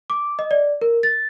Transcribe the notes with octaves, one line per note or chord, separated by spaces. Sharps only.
D6
D#5
D5
A#4
A6